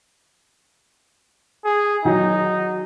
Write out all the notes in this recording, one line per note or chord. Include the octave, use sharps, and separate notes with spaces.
G#4
D#3 F#3 D#4